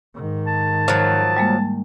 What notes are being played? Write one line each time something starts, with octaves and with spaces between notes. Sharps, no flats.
G#2 D#3
A5
F3 F#3
G3 G#3 A#3